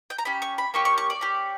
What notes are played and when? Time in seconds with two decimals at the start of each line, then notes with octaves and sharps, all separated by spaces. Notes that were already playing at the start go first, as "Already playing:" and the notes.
0.10 G5
0.18 A#5
0.25 C#4 G4 B5
0.42 C#6
0.58 B5
0.74 A#3 C#4 G4 C#6
0.85 C#6
0.98 C#6
1.10 D5
1.21 C#4 G4